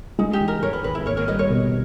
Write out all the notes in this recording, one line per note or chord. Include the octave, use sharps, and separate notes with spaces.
G#3 D#4
G4
E3
A#4
G#2 A#4 C#5
B4
G#1 B4
E4
A#3 A#4 C#5
A#4 C#5
G3 B4 D#5
A#4 C#5
B2